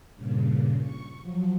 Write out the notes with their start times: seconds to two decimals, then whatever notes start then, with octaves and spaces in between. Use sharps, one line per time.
0.15 G2 A#2 C#3
0.82 C#6
1.22 F3 F#3